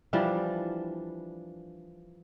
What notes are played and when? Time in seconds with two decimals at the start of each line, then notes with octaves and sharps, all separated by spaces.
0.13 E3 F3 G3 D4